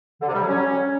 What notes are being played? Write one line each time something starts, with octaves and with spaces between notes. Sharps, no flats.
D3
C3
G3
F#3
C#4